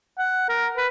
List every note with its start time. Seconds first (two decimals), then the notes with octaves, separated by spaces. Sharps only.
0.19 F#5
0.49 A#4
0.77 B4